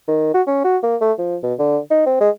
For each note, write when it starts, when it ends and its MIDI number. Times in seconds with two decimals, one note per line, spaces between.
0.08 0.30 51
0.34 0.42 66
0.47 0.64 61
0.64 0.77 66
0.83 0.96 58
1.01 1.12 57
1.19 1.37 53
1.43 1.54 47
1.59 1.79 50
1.91 2.05 63
2.06 2.20 60
2.21 2.30 56